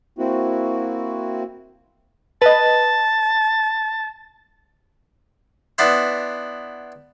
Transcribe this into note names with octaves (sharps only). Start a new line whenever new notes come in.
A#3 C4 E4 F#4
B4 D#5 A5
B3 D4 E4 C5